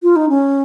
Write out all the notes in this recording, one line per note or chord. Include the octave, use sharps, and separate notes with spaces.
F4
D#4
C#4